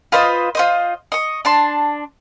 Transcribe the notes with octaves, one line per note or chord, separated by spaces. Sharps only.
F4 B4 C5 D#5
F4 C5 D#5
D#5 C#6
D4 A5 C6